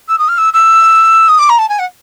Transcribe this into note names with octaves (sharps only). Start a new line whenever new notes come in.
E6
D#6
F6
E6
E6
D#6
D6
A#5
A5
G#5
F#5